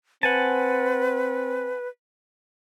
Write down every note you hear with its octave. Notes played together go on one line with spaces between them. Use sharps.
C4 B4 F#5 G#5 A5